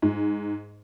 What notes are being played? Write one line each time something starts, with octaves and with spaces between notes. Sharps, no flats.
G#2